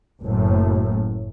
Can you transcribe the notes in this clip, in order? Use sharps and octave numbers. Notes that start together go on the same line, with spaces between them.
F#1 F#2 A2